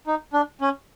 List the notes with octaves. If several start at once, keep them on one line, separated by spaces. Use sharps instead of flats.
D#4
D4
C#4